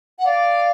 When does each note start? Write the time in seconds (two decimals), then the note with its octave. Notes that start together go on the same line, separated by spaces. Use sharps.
0.19 F#5
0.26 D5 F5